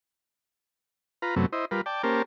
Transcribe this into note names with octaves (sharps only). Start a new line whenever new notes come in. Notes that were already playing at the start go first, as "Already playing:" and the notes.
F4 B4 A#5
F#2 C3 F#3 A3 B3
E4 C5 D#5
G3 F4 A#4 B4
D5 G5 A5
A#3 C#4 G4 A#4 C5 A5